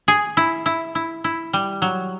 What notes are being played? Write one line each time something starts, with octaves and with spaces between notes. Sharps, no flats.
G#4
E4
E4
E4
E4
G3
F#3